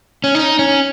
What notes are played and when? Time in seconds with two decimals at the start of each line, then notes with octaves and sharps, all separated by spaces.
0.24 C#4
0.35 D#4
0.59 C#4